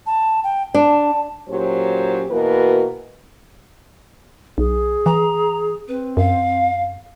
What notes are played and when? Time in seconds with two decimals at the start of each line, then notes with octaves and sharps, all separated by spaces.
0.06 A5
0.44 G5
0.74 D4 A5
1.49 A#2 F#3 C#4 G4 C5
2.30 B2 E3 A#3 F#4 A#4 B4
4.58 B1 G#4
5.06 E3 A#5
5.88 C4 B4
6.17 F#2 F5